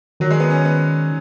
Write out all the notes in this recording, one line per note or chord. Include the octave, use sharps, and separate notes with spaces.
D#3 F#3
G#3
B3
C#4
B3